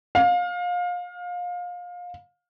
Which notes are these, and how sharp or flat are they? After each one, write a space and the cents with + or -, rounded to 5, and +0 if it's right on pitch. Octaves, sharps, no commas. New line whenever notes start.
F5 +25